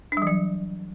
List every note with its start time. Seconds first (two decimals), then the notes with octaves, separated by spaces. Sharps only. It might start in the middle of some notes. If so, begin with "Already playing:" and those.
0.12 D4
0.17 G3
0.22 E3
0.27 F#3